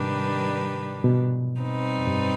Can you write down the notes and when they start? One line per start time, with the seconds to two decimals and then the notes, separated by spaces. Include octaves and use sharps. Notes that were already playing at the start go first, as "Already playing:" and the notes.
Already playing: G#2 C3 D#3 G3 D4 G4 B4
1.04 B2
1.60 G3 C4 D#4 B4
1.98 F2
2.07 G2